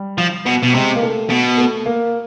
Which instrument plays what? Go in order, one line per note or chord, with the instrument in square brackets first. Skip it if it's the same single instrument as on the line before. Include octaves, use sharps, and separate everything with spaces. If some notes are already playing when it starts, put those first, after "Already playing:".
Already playing: [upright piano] G3
[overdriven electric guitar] F3
B2
B2
[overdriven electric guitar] C3 [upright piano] G#3
[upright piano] A#3
A3
[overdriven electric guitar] B2
[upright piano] A3
A#3